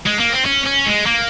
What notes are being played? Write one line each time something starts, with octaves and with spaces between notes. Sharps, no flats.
G#3
A#3
C4
C#4
C#4
G#3
A#3